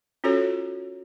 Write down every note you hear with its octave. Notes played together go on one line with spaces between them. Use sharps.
C#4 F4 F#4 A4 C#5